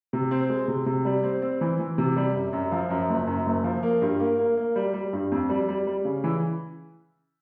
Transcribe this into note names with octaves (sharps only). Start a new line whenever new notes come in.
C3
C4
G#3
C3
C3
G3
C4
C4
E3
E3
C3
G3
F#2
F#2
F3
F#2
F#1
F#2
F#1
F3
A#3
G2
A#3
A#3
A#3
G3
G3
G2
F2
G3
G3
G3
C#3
E3